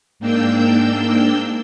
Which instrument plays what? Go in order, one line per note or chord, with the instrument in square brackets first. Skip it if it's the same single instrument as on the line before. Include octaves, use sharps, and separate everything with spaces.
[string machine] G#2 A#3 D4 G5 E6 G6